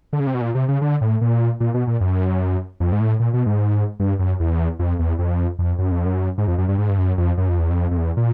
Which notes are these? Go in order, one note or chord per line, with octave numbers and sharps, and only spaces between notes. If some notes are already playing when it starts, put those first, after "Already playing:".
D3
C#3
C3
B2
A#2
C3
C#3
D3
A2
A#2
A#2
B2
A#2
F#2
F2
G#2
A2
A#2
B2
G#2
G2
F#2
E2
F2
E2
F2
F2
F#2
F2
F#2
G#2
F2
F#2
G2
G#2
G2
F#2
F2
F#2
F2
E2
F2
F2
E2
A#2